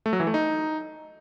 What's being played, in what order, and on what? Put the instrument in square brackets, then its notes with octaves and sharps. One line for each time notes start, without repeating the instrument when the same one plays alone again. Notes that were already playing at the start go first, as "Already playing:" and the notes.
[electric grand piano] A3
F#3
E3
A3
D#4